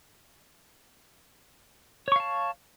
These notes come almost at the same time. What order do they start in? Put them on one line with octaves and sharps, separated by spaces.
C#5 C#6 F5 A5